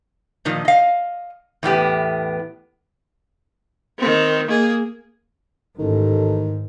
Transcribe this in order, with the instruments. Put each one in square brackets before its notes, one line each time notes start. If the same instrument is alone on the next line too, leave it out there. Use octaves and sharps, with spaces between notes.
[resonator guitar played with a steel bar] A#2 D#3 F3
D#5 F5
E2 A2 B3 G4
[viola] D#3 C4
A#3 G#4
[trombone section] A1 A4 [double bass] G#2 [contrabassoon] D#3